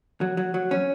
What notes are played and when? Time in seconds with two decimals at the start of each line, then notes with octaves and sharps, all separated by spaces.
0.21 F#3
0.37 F#3
0.54 F#3
0.71 C#4